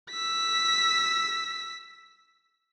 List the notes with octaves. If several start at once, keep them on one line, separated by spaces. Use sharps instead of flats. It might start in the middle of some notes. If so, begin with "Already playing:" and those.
E6 B6